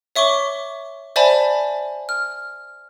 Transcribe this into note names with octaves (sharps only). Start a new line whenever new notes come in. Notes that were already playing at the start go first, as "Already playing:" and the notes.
C#5 E5 C#6 D6 G7
C5 D5 E5 G#5 A5 B5
F6